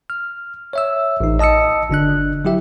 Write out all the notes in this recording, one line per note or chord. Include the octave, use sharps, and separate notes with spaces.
F6
C#5 E5 E6
A1 D#4
D#5 A5 D#6 E6 C#7
G1 D3 D4 F#6
F#3 E4 G4 E5